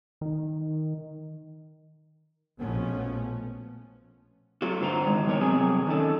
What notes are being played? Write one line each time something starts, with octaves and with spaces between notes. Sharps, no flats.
D#3
A#1 B2 F3 A3 B3 C#4
F#3 A3 F4 F#4
G2 D3 C5 G#5 A#5
D#3 G#3
D#3 G3 B3 A#4 C#5
F2 C3 F#3 G#4 G#5
D#3 C#4 A4